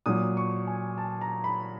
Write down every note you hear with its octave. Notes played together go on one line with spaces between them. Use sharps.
A#2 F#3 D#6
C#6
G#5
A5
A#5
B5